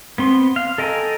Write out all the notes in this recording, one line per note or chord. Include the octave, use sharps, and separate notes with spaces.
B3 C4 C6
F5
A4 D#5 G5 G#5 A#5